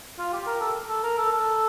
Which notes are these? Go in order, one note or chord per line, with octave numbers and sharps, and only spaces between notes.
F4
G4
A#4
A4
A4
A#4
A4
A4